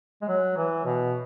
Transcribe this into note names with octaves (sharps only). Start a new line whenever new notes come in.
G#3
F#3
E3
B2